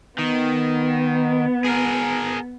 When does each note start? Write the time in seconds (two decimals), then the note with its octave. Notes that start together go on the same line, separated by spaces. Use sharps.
0.18 D#3 B3
1.66 G#4 A#4